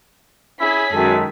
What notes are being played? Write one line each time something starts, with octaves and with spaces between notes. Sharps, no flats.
C#4 E4 G#4 B6
F#2 D#3 G#3 A4